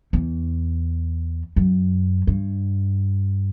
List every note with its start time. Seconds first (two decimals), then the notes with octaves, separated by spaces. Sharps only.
0.13 E2
1.56 F#2
2.27 G2